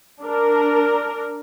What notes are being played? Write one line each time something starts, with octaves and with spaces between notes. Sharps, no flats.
D4 A#4